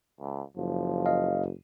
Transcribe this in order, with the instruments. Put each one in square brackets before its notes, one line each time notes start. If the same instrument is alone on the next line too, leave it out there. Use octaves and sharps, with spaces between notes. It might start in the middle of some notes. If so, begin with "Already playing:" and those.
[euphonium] C#2
[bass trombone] F#1 [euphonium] F3
[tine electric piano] D#5 F5